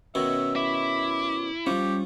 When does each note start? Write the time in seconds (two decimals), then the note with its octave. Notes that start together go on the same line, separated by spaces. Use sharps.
0.15 B2 D#3 C#4 C#5 E5
0.56 E4 D6
1.67 F3 G3 C#4 G4